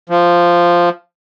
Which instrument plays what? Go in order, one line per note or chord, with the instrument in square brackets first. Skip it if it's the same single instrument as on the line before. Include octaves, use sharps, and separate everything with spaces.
[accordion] F3